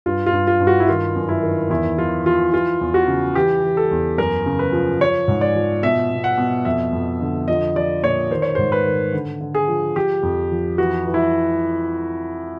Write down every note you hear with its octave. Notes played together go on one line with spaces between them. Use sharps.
G2 F4
F4
G2
F4
G2
F#4
E4
D#3 F4
F#2
E4
D#3
E2 E4
F3 F4
F3 F4
E3 F4
E2
F#4
C#3
E3 G4
E3
A4
E2
F#2 A#4
C#3
B4
F3
F3 C#5
G#2
D5
F3
B2 E5
B2
F#5
B2
F2 E5
F2
D3
F3 D#5
F3 D5
A#2 C#5
D#3 C5
C#5
G#2 C5
B4
D#3
D3
D3
G#4
F3
F3 G4
F2
F3
E3 F#4
E3
E4